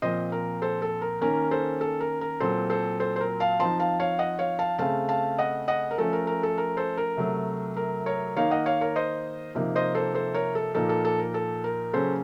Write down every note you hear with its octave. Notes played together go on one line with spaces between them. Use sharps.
A#2 F3 C4 C5 D#5
A#4
A4 C5
A4
A#4
D#3 A#3 C#4 A#4
A4 C5
A4
A#4
A#4
A#2 F#3 C4 A4 C5
A4 C5
A4 C5
C5
A#4
F5 A5
F3 C4 D#4 A5 C6
F5 A5
C#5 F5
D#5 F#5
C#5 F5
F5 A5
C#3 A3 C4 F5 A5
F5 A5
D#5 F#5
D#5 F#5
A#4
F3 A3 C#4 A4
A#4
A#4
A4
A#4
A4 C5
A#4
C3 F#3 A3
A#4
A#4 C#5
D#3 A#3 D#4 C#5 F5
D#5 F#5
C#5 F5
A#4 C#5
C5 D#5
C3 F3 A#3 D#4
C5 D#5
A4 C5
A4 C5
A#4 C#5
A4
A#2 F3 A#3 D#4 A4
A4
A4
A#4
A4
A#4
C#3 F#3 A#3 C#4 A4 C5